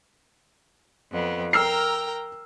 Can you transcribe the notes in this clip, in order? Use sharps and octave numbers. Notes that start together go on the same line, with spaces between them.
F2 B3
A#4 G5 A#5 E6 F6 C7